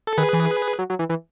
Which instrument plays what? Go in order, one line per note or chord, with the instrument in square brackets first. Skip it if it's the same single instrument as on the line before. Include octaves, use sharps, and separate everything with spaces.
[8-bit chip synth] A4
[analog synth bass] D#3 [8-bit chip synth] G#4 B4
[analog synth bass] E3
F#3
F#3
E3
E3